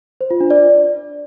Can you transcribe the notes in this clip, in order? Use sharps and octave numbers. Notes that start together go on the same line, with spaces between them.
C5
F4
D4
D5